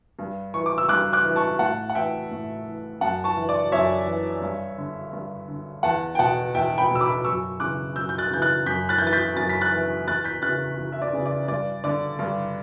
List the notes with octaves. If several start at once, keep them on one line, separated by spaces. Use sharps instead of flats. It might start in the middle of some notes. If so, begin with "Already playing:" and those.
G2
E3 C#6
D6
E6
G2 D6 F#6
D6 F#6
E3
A5 C#6
A2 F#5 A5
F#5
E3 E5 G5
A2
E3
F#2 F#5 A5
A5 C#6
E3
D5
F#2 C#5 E5
E3
G2
D3
G2
D3
E2 F#5 A5
G5
B2 F#5 A5
E2 E5 G5
G5 B5
B2
E6
B5 D6
F#2 C#6 E6
C#3 E3 D6 F#6
F#2 E6 G6
G6
F#6 A6
C#3 E3 G6
F#6 A6
F#2 G6 B6
F#6 A6
G6
E3
A6
G6 B6
F#2 A6
B6
F#6 A6
E3
E2 F#6 A6
G6 B6
C#3 E3 F#6 A6
E2
E5
D5
C#3 E3
D5
G2 D5
D3 D5
G2